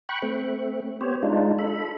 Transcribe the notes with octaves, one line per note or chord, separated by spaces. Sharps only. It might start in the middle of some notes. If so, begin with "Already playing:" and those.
G5 B5 C#6 F#6
A3 C4
B3 G4 C5 C#5
G#3 D4 D#4 F4
A4 B5